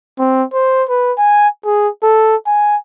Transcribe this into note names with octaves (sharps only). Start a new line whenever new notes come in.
C4
C5
B4
G#5
G#4
A4
G#5